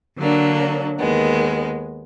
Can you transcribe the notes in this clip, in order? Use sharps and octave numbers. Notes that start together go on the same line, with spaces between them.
D3 F#3 A#3 D4
D#2 D#3 G#3 B3